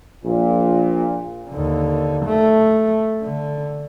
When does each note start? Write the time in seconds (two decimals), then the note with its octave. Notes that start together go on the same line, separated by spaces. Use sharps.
0.24 A#1 A#2
1.50 D#2 D3
2.26 A3
3.23 D3